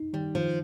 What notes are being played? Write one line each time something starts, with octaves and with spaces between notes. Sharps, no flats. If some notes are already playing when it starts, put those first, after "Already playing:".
Already playing: D#4
D#3 G3
D#3 F3